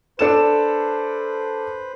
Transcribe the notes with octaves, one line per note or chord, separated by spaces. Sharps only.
D4 A4 B4 C5 E7